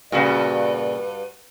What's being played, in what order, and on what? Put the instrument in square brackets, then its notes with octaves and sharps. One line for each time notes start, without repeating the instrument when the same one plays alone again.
[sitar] G2 F#4 [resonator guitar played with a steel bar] A#2 C#3 [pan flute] B4 [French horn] D5